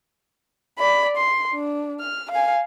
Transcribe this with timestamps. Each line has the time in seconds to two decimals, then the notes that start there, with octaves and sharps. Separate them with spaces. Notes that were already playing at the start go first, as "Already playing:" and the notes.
0.79 D5 B5
1.16 C6
1.53 D4
2.00 F6
2.31 F5 G#5